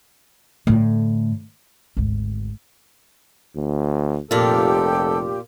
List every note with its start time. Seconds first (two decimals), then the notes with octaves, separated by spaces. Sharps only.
0.67 A2 D3
1.97 G#1 D2
3.56 D2
4.31 F1 A#2 F4 G4 A4